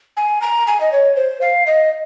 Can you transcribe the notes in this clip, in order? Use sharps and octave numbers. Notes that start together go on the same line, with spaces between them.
G#5
A#5
G#5
D#5
C#5
C5
F5
D#5